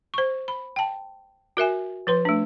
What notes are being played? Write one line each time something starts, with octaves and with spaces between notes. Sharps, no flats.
C5 C#6
B5
G5 A5
F#4 A#4 E5 G#5
F3 B4 C6
A3 D4